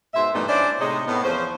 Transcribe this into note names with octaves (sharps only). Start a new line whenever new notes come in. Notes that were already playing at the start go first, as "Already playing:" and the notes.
G#2 B2 C5 E5
G2 A#2 E3 A3 B3 D#4
C#4 D4 E4 C5 D5
A2 C3 G#3 D#4 C#5 D#5
A2 B3
E2 F3 C#4 C5